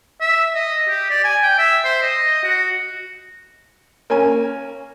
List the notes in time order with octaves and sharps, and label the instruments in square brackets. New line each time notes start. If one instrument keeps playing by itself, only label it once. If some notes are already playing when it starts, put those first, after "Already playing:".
[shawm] E5
D#5
G4
D5
G#5
G5
E5
C5
D#5
F#4
[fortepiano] A#3 C#4 G#5